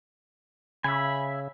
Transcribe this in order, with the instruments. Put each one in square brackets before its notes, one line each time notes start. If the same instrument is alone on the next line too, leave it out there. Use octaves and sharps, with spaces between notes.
[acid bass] C#3 [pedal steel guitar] E5 G#5 [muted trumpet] B5